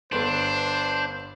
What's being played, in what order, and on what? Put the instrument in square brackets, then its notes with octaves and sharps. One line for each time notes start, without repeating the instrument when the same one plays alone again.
[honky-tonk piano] G1 B4 C6 [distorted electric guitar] D4 [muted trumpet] C5